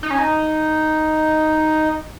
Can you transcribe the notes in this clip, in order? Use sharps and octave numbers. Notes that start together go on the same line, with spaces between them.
D#4
C#4
D#4